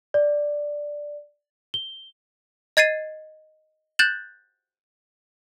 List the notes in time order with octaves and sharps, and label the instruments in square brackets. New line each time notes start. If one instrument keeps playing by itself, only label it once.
[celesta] D5
G7
[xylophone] D#5 G#6 A6 C7 D#7
F#6 G6 A6 E7 F#7